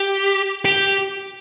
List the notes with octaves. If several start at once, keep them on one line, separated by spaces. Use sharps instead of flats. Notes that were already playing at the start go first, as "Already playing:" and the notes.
Already playing: G4
G4